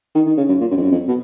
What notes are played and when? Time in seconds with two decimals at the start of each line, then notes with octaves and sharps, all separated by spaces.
0.15 D#3
0.26 D#3
0.37 C#3
0.49 F#2
0.60 A#2
0.71 F#2
0.77 F2
0.82 F#2
0.92 F2
1.08 B2